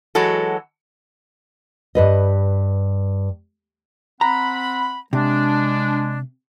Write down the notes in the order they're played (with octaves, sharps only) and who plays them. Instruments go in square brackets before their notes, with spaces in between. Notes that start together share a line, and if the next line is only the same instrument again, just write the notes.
[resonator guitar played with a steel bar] E3 F#3 G#3 F#4 A4
[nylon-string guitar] G2 B4 D#5
[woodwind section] C4 F#5 B5 [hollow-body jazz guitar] A#5
[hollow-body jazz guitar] C3 [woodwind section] G#3 D4